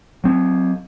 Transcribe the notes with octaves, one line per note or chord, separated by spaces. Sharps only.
F#3 C4